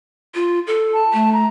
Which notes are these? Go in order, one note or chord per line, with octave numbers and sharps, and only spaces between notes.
F4
A4
A5
A3
A#5